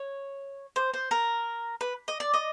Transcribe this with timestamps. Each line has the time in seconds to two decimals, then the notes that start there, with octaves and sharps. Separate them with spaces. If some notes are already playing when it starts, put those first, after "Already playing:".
Already playing: C#5
0.76 C5
0.94 C5
1.11 A#4
1.81 B4
2.08 D#5
2.20 D5
2.34 D#5